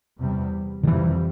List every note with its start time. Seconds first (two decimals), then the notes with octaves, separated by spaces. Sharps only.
0.19 E2 C3 G3
0.83 D3
0.87 F2 C3 E3 G3